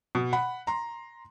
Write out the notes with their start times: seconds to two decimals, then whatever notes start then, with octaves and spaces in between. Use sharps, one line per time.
0.15 B2
0.33 F#5 B5
0.67 A#5 C6